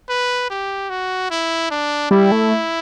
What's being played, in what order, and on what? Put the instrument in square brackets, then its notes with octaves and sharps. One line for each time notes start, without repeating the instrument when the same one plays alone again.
[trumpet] B4
G4
F#4
E4
D4
[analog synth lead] G3 [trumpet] E4
[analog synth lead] A3